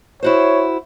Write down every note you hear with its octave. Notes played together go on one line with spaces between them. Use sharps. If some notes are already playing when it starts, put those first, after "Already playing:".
E4 F#4 C5 C#5